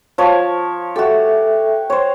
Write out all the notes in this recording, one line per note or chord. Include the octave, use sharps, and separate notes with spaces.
F3 C#5
F#4 G4 A4 E5
C5 C#5